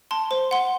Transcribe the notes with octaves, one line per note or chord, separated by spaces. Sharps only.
A5 C6
C5
F#5 C6